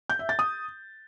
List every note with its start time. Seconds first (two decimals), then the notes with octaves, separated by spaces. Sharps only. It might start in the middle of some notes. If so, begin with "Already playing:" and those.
0.10 G6
0.19 E5
0.29 A6
0.39 D#6